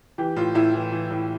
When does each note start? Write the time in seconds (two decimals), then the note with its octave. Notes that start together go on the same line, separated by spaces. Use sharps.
0.18 E3 G4
0.36 A2 F4
0.55 A2 E4
0.73 E3
0.91 E3
1.10 A2